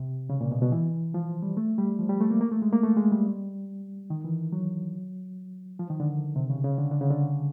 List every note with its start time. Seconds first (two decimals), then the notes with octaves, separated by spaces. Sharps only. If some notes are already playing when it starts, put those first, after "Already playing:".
Already playing: C3
0.30 C#3
0.41 A#2
0.51 B2
0.62 B2
0.72 E3
1.14 F3
1.42 G3
1.57 A3
1.78 G3
1.99 F3
2.09 G3
2.20 A3
2.31 A#3
2.41 A#3
2.52 A3
2.62 G#3
2.72 A#3
2.84 A3
2.97 G#3
3.12 G3
4.10 D#3
4.24 E3
4.52 F#3
5.79 F3
5.90 D#3
6.00 D3
6.36 C3
6.50 C#3
6.64 C#3
6.78 D3
6.91 D3
7.01 C#3
7.10 D3